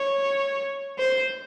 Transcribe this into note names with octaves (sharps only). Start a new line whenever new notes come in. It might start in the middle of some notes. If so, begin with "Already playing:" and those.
Already playing: C#5
C5